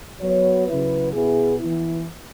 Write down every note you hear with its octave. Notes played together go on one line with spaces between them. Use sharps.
F#3 B3 F#4 C#5
C#3 F#3 E4 B4
B2 B3 E4 G#4
E3 B3 E4